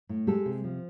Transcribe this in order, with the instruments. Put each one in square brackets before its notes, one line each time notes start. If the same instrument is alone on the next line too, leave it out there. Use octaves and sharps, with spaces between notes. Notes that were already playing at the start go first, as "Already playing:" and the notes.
[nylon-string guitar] A2
G#3 G4 A4
C3
F3